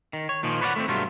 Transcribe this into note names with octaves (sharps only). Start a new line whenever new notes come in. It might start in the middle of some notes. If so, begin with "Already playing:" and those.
D#3
C#5
A#2 D#3 F3
B4 C#5 D5 F5 F#5
A3 B3 C4
G2 B2 F#3 A3 F4